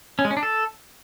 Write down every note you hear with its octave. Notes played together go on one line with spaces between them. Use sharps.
C#4
G#3
C#4
D4
A4